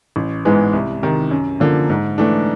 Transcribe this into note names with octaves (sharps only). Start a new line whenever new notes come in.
A1
G#2 E3 G#3 B3
C2
C3 D#3
F#2
D3 F3 A#3
G#2
E3 A3 D4